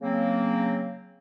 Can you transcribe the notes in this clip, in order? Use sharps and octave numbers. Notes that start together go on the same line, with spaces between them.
C#3 F#3 A#3 C4